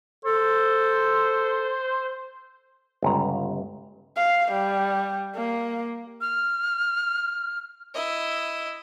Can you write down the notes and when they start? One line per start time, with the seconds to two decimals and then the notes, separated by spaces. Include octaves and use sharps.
0.25 A4 C5
3.02 G1 C#2 A#5
4.17 F5
4.52 G3
5.35 A#3
6.21 F6
7.95 E4 D#5